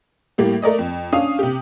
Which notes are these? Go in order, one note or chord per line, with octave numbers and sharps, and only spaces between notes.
A2 G3 A#3 G4
A3 A#4 D5 D#5
F2
C#4 D4 F5 D#6
C3 G4